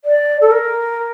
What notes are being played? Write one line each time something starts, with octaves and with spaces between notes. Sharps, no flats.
D5
A4
A#4